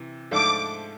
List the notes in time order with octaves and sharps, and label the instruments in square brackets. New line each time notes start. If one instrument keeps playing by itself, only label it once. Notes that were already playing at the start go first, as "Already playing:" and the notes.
Already playing: [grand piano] C3 E3
[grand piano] G#2 F3 A3 D4 A4 [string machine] D6